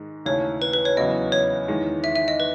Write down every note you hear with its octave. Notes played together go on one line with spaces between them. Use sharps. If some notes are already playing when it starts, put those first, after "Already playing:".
Already playing: G#2 D#3 G#3
D#2 C#3 E3 A3 C#4 C#5
B4
B4
C#5
E2 C#3 F#3 B3 D#5
C#5
E2 D#3 G#3
E5
E5
D#5
B4